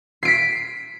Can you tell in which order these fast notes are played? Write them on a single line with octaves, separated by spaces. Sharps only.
C7 D7 B6